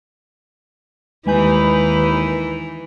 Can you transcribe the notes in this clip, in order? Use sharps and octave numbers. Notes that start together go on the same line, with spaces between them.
D#2 E3 G#3 D#4 B4 G#5 G6